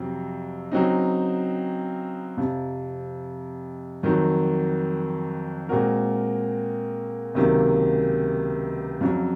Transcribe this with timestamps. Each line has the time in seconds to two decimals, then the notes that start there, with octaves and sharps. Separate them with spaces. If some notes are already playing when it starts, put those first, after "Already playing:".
Already playing: F2 C3 F#3 C4
0.72 C#3 F#3 C4 D#4
2.37 F2 C3 F3
4.03 F2 D#3 F#3
5.69 A#2 G#3 C4 F#4 A#4
7.35 C#2 C3 D#3 F#3 A#3
9.01 F2 C#3 F#3